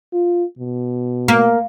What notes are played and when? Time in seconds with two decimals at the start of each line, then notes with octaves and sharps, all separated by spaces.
0.13 F4
0.59 B2
1.28 A#3